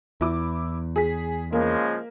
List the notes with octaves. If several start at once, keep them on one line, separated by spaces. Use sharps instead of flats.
E2 E4 D6
G#4 B6
C#3 F3 G#3 A#3